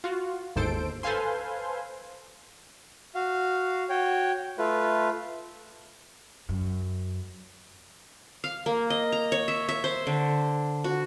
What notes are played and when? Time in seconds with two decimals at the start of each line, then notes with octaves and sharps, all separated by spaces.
0.04 F4 F#4
0.56 G1 D#2 G#2 A4 C5 D7
1.03 A4 B4 C5 F5 G#5 C6
3.15 F#4 F5
3.89 F#4 C#5 G5
4.58 A3 F4 B4
6.49 F#2
8.44 F5
8.66 A#3
8.90 D#5
9.12 A#5
9.32 C#5
9.48 E5
9.69 E5
9.84 C5
10.07 D3
10.84 F#4